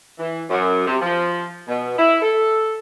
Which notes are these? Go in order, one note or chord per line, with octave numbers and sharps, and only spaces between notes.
E3
F#2
C3
F3
B2
E4
A4